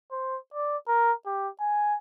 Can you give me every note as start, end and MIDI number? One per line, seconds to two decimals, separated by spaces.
0.12 0.37 72
0.54 0.77 74
0.88 1.13 70
1.26 1.49 67
1.60 1.96 80